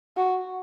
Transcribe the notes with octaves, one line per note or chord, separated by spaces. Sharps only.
F#4